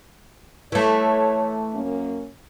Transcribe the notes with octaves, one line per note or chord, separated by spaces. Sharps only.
E3 A3 C#5
F#2 A#3 C#4